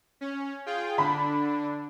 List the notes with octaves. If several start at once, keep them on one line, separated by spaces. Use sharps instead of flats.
C#4
F4 G#4 G5
D3 D4 B5